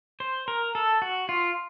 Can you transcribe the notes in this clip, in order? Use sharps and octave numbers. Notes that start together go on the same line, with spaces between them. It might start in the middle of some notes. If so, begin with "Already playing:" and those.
C5
A#4
A4
F#4
F4